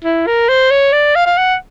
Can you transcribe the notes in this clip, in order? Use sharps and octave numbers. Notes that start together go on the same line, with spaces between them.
E4
A#4
C5
C#5
D5
F5
F5
F#5